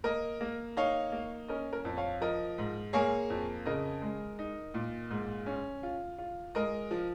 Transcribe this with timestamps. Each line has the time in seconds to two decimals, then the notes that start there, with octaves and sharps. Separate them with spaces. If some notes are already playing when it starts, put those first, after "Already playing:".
0.04 A#3 A#4 D#5
0.41 A#3
0.77 D#4 C#5 F5
1.12 A#3
1.48 C#4 A#4 D#5
1.73 A#4
1.85 F2
1.97 C#5 F5
2.21 F3 A#4 D#5
2.58 G#2
2.93 A#3 G#4 C#5
3.30 F2
3.66 C#3 A#4 D#5
4.02 G#3
4.39 D#4
4.74 A#2
5.10 G#2
5.46 C#4
5.83 F4
6.18 F4
6.55 G#3 A#4 D#5
6.91 F3